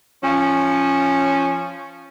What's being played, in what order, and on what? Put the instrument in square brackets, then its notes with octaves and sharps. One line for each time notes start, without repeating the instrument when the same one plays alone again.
[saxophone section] F3 C#4